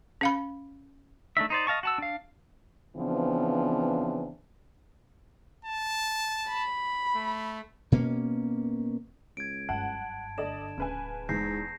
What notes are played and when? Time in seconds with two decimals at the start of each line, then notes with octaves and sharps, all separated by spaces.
0.21 C#4 F5 B5
1.37 A3 D4 D#4 E5
1.50 D#4 C5 D5
1.67 D#5 F5 A5 C#6
1.83 F#4 A5 E6
1.98 D4 F5
2.97 C#3 E3 F3 B3 C4 D4
5.65 A5
6.49 B5
7.15 A3
7.92 B2 A#3 C#4
9.37 C#2 G#6 D7
9.69 F#1 G2 F#5 A5
10.38 D3 A4 D5 D#5 E7
10.78 D1 C#3 B4 G#5
11.29 E2 G#2 G6 A#6 C7